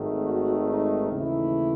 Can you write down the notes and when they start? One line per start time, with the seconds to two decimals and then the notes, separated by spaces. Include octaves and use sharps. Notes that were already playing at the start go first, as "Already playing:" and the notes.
Already playing: G#1 G#2 D#3 A3
0.22 F#4
0.67 D#4
1.11 D#2 C#3 E3 A3 E4